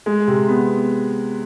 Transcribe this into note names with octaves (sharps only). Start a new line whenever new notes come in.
G#3
C3
B3